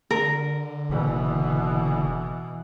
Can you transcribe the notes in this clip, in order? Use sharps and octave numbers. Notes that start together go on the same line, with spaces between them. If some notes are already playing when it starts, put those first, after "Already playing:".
D3 A#4
F#1 B2 E3